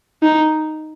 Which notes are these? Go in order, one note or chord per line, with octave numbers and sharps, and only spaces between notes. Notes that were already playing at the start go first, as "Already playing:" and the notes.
D#4